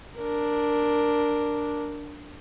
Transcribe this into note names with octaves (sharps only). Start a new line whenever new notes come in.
D4 A#4